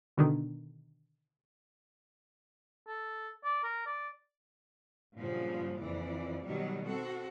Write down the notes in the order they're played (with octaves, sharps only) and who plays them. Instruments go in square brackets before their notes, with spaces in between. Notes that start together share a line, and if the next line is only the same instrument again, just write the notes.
[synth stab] B2 D3 D#3
[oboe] A4
D5
A#4
D5
[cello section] G2 A#2 C#3 F3 F#3
F2 E3 D5
B2 D#3 F#3 G3
C4 F#4 A4